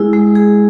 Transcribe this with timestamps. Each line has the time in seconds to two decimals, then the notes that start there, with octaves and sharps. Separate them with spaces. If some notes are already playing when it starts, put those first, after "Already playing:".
Already playing: G#3 E4 G#4
0.13 G#3
0.35 G#4